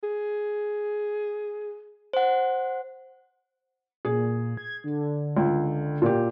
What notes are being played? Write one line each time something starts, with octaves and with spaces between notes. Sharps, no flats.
G#4
C5 F#5
A#2 G#4
G#6
D3
C#2
A#2 G4